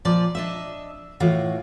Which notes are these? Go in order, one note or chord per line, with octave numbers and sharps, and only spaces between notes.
A#2 F3 D5
D4 D#5 E5
A2 E3 F4 F#4